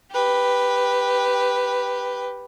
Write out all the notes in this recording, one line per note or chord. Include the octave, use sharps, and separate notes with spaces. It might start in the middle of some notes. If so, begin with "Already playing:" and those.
G4 B4